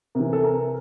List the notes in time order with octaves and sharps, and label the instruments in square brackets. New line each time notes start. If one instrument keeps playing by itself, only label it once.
[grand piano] C3 E3 A#4
A4
A#4